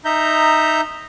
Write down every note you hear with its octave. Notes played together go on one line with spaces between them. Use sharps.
D#4 E5 A#5 G6